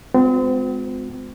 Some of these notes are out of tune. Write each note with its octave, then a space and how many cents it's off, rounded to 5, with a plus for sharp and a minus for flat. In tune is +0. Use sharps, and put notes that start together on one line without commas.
G#3 +15 C4 -35 F4 +45